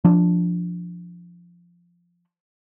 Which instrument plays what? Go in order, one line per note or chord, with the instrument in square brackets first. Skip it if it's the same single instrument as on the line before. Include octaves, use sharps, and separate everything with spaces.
[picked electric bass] F3 D4